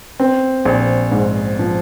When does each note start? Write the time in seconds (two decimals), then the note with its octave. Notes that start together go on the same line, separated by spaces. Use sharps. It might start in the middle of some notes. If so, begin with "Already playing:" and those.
0.20 C4
0.65 A#1
1.11 G#2
1.59 F3